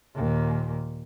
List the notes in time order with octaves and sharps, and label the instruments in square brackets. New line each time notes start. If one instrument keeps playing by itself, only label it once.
[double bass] D#2 A#2